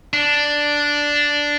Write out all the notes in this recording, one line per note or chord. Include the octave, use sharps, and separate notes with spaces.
D4